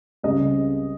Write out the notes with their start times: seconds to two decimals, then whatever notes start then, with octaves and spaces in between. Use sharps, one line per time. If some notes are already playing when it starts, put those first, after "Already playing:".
0.23 C#2 C#3 G3 C4 D#5